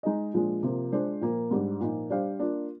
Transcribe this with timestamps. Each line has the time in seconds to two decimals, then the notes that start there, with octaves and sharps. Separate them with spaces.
0.03 G#3 D#4 G#4 D#5
0.34 A#2 F3 G#3 D4
0.63 C3 F3 A#3 F4
0.92 G#3 D4 F4 C5
1.21 A#2 F3 A#3
1.51 G#2 G3 D4
1.80 A#2 F3 A#3 D#4
2.10 G3 D4 G4 C5 F5
2.39 A#3 D4 F4